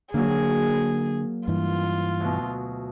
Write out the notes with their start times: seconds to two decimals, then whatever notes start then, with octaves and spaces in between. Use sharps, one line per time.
0.14 D3 F#3 A#3 G#4
1.48 G2 E3 F4
2.20 D2 B2